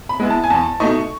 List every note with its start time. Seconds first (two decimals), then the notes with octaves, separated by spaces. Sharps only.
0.09 B5
0.20 G#3 B3 E4
0.30 A5
0.44 G#5
0.50 E2 A5
0.80 B2 A3 D#4 C#6